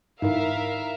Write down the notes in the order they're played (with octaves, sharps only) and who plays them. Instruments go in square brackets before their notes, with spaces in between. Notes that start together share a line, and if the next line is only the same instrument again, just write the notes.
[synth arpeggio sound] G#2 D#3 [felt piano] D#4 E4 [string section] A#4 E5 F5